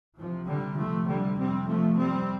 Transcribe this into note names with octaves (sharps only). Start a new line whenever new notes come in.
D2 C3 F3
D3 G3
F3 A3
D3 G3
F2 C3 G3 C4
F3 A3
G3 C4